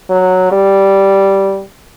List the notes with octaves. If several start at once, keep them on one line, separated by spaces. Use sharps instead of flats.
F#3
G3